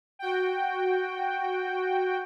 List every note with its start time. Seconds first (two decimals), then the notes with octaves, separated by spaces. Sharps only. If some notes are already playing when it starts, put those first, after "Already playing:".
0.19 F#4 G5